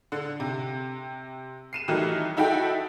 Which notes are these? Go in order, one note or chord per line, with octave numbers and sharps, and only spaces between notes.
D3
C3
C7 D#7 E7
D#3 E3 F#3 G3 A3 D#4
D#4 E4 F#4 A4 G5